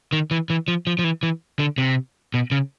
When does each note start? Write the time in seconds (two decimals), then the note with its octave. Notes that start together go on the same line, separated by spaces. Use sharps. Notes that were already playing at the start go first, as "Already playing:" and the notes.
0.13 D#3
0.31 E3
0.50 E3
0.68 F3
0.87 F3
0.99 F3
1.04 E3
1.23 E3
1.59 D3
1.78 C3
2.34 B2
2.51 C#3